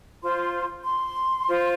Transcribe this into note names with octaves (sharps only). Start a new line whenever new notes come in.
F4 C5 C6
C6
F4 C5